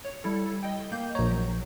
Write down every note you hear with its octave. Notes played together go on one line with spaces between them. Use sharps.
C#5
G3 E4 A4
D#5 G5
A#3 G6
A#1 C#5 A#5
F#3